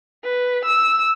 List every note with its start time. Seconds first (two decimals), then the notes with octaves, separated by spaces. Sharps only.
0.24 B4
0.65 E6